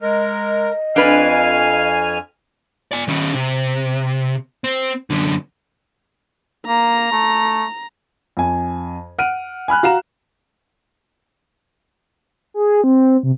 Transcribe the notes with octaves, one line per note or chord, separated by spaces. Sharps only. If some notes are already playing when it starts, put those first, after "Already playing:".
G#3 A#4 D#5
F2 D4 B4 F5 G#5 F6
D5 G#5
D#3 C#4
C3
C4
F#2 D3
A#3 A#5
A3
F2 G#5
F#5 F6 D7 D#7
G#5 B5 F6 F#6
F#4 F5 A#5 E7
G#4
C4
C3